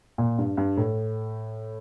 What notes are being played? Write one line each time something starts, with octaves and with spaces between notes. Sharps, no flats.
A#2
G2
G2
A2